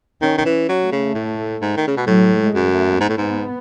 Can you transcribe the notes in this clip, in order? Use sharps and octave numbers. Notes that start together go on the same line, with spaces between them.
D#3 C#4
D#3
E3
F#3
A3
C#3
A2
G#2
D#3
C#3
B2
A2 F#3
G#3
F#2
A3
G#2 B3
A2
G#2